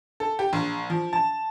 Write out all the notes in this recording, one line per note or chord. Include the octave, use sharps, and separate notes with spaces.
A4
G4
A#1
F3
A5